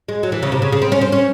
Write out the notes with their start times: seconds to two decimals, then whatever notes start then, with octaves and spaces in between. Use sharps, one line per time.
0.08 G#3
0.23 F#3
0.32 E3
0.42 C#3
0.52 C3
0.62 C#3
0.72 C#3
0.82 C4
0.92 C#4
1.01 C4
1.12 C#4